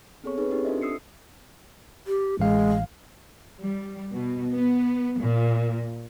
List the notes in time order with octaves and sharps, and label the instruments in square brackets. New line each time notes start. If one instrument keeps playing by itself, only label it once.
[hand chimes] B3 C4 G#4 A4 C#5 C#6
D#4 G#4 A4 B4
C4 C#4 D#4 G4
D4 F4 A4 C5 D#5 E5
D#6 E6 C7 C#7
[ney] G4
[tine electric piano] A1 F5 [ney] G#3
[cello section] G3
B2
B3
A#2